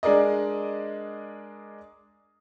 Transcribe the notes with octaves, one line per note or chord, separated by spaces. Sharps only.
G#3 D4 G#4 A#4 D5 D#5